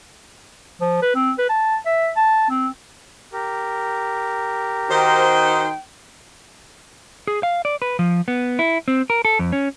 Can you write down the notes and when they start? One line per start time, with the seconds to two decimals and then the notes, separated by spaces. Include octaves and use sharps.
0.81 F3
1.02 B4
1.15 C4
1.38 B4
1.49 A5
1.86 E5
2.16 A5
2.50 C4
3.33 G4 A#4
4.90 D#3 D#4 F#4 C5 G5
7.28 G#4
7.43 F5
7.65 D5
7.82 B4
7.99 F3
8.28 B3
8.59 E4
8.88 C4
9.10 A#4
9.25 A4
9.39 F2
9.53 C#4